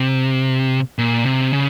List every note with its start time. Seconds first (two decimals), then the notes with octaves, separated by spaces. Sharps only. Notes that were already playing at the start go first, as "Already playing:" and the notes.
Already playing: C3
0.98 A#2
1.26 C3
1.53 C#3